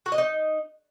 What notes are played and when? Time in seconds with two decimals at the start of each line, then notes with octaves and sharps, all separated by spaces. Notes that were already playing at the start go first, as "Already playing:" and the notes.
0.06 F#4
0.12 D#5
0.18 D#4